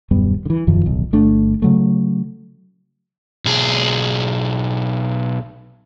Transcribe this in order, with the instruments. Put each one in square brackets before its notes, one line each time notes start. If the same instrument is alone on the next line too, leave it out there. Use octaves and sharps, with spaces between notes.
[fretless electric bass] D#1 F#2 G3 B3
D3 E3
E1 F#2 D#3 F3
D1 B1
G1 A3 D4
C#3 F#3 A3
[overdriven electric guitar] B1 G#4